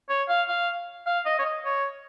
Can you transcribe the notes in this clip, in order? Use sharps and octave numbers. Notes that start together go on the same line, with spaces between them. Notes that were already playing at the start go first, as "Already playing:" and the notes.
C#5
F5
F5
F5
D#5
C#5
D#5
C#5